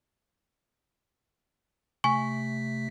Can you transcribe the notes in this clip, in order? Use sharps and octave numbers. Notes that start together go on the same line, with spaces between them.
C3 A3 G#5 C#6 B6